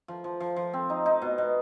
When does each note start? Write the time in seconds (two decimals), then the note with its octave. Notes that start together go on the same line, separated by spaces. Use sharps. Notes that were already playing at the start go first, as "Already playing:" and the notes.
0.08 F3
0.24 F3
0.40 F3
0.56 F3
0.73 C4
0.90 D#4
1.06 D#4
1.22 B2
1.38 B2